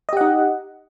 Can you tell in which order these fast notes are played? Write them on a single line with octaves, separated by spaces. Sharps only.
D#5 G4 F#5 D#4